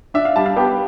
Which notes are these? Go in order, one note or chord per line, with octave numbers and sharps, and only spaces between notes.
D4 E5
F5
G3 A5
F5
B3 G4